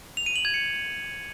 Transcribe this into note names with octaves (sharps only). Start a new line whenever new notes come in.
F7
D#7
F#7
G#6
C#7